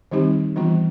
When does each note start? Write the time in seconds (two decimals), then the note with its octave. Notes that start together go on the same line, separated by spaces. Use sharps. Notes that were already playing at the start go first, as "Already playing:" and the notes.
0.11 D#3 G3 C4 D#4 G4
0.56 E3 G3 B3 D4 F4